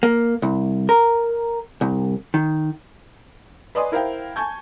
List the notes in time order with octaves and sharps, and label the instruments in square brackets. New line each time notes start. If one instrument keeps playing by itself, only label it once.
[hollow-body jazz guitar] A#3
C2
A#4
C2
D#3
[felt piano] B4 D5 D#5 G#5 C6 D#6
E4 A#4 C5 F5 G5
G#5 A5 C#6 G6 G#6